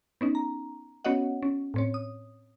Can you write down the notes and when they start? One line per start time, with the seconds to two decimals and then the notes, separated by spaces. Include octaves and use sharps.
0.21 B3 C#4 D#4
0.35 A#5
1.05 B3 C#4 F#4 C#5 D#5 F#5
1.43 C#4
1.74 A2 C4 C#5
1.94 D#6